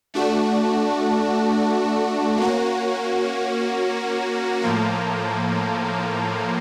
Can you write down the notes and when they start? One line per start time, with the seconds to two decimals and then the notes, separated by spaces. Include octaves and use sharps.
0.14 A3 D4 F#4
2.38 A#3 C#4 F#4
4.62 A2 F3 A#3